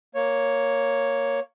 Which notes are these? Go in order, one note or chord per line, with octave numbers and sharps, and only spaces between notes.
A#3 C#5